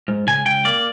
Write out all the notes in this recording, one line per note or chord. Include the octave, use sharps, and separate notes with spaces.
G#2
C#2 G#5
C#2 G5
A#3 D5